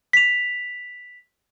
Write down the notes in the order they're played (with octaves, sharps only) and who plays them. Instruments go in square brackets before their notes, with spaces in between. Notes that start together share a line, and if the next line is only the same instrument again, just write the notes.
[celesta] B6 F7